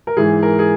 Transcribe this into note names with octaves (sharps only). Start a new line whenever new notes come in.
A#4
G#2 E3 G#4
A#4
G#4